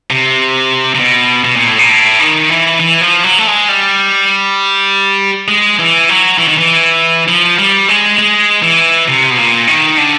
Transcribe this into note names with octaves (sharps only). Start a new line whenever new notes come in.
C3
C3
B2
B2
A#2
A2
A#2
A2
D#3
E3
E3
F3
F#3
A3
G#3
G3
G#3
E3
F#3
E3
D#3
E3
F3
G3
G#3
G#3
E3
C3
B2
A#2
D#3
D3